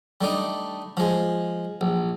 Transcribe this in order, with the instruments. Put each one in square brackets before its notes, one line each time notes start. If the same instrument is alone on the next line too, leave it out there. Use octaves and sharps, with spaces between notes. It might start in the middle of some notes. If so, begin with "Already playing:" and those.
[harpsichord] G3 A3 D4 D#4
F3 G#3
A#1